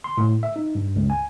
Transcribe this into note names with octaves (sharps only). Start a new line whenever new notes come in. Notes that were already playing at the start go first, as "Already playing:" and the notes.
C6
A2
E5
D#4
G2
C#2
G#5